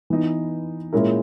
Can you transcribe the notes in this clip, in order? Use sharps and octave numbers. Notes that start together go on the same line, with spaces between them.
E3 B3 D#4
A#2 G#3 C#4 E4 A#4